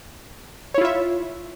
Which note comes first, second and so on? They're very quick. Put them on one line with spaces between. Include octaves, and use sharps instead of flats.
C#5 E4 F4 E5